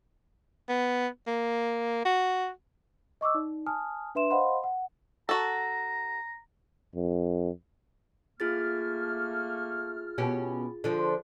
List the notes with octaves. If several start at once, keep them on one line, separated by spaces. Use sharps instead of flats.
B3
A#3
F#4
D#5 C#6 D6 E6
D#4 D5
G#5 A5 D#6 F6
D4 B4 E5 C6 E7
C5 D#5 F5 F#5 B5 C6
F#5
F#4 A4 A#5
F2
A3 A#3 F4 G#4 F6 A6
B2 C#4 G4
D3 F3 D4